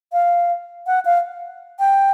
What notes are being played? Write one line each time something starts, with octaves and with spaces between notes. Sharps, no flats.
F5
F#5
F5
G5